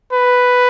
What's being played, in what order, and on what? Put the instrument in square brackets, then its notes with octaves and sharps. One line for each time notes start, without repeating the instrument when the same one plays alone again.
[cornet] B4